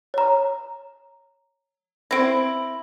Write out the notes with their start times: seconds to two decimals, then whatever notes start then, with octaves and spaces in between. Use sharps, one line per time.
0.14 C#5 A#5
2.11 C4 E4 A#6 D7